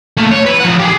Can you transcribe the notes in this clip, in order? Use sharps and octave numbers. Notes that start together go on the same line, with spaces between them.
A3 A#3
C#5
E4 B4
F3 F#5
G4 G#4